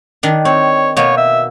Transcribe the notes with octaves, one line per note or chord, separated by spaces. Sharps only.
D#3 D4
C4 C#5
B2 A#3 C#5
E5